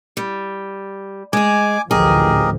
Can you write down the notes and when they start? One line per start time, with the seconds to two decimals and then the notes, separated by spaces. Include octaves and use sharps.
0.17 G3
1.33 G#3 G#4 G#5 D6
1.91 A1 D2 F3 G4 G#4 A#4 D#5